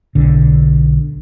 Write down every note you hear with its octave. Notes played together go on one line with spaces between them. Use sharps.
B1 D3